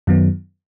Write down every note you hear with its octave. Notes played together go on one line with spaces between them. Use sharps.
F#2 D#3 F#3 B3